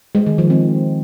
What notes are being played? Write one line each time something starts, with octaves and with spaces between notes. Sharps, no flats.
G#3
D#3
F3
C4